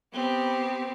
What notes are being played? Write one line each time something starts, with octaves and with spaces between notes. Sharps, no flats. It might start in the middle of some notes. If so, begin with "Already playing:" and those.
B3 C4 G4